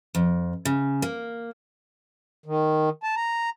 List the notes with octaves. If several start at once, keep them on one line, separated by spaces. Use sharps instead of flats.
F2
C#3
A#3
D#3
A5
A#5